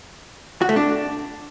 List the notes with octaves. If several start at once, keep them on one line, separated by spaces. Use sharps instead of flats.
F#4
A3
D4